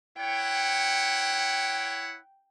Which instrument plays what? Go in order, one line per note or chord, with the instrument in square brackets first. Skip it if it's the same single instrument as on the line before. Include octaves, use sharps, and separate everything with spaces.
[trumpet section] E4 C#5 F#5 [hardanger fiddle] G5